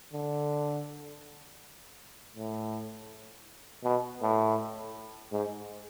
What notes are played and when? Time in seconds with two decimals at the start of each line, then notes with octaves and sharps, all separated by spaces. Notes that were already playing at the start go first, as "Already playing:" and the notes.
0.13 D3
2.36 A2
3.84 B2
4.22 A2
5.32 G#2